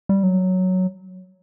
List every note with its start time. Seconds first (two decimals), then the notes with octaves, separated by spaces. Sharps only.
0.09 G3
0.23 F#3